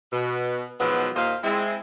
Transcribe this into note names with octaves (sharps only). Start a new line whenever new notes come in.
B2
B2 D#3 F3 F#3 G#3 B3
D#2 A#2 A#3 C5 D#5 F5
G#3 C4 E4